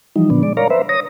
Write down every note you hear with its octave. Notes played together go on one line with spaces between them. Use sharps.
E3 F3 G3 D#4
A#2 D3 F3 B3 D4
G#3 D5
A#4 C#5 D5 F5 A#5
B4 C5 E5
C#5 D#6 A#6